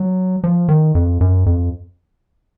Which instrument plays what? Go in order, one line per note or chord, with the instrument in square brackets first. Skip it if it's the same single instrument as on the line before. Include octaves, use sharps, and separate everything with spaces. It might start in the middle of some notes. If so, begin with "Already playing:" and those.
Already playing: [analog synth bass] F#3
F3
D#3
F2
F#2
F2